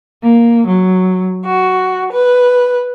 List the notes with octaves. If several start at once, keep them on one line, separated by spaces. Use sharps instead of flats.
A#3
F#3
F#4
B4